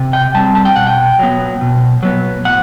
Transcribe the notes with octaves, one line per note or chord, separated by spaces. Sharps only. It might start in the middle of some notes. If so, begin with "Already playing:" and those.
Already playing: C3
G5
G3 C4 A5
A5
G5
B2 F#5
G5
F#3 B3
B2
F#3 B3
A2 F#5